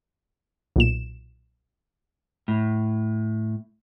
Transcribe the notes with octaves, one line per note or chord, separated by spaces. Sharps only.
B1 A#2 E7
A2